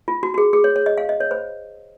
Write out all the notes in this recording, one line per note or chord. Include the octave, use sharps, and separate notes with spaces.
F4
F#4
F#4
G#4
G#4
C#5
C#5
D#5
F5
D#5
C#5
C5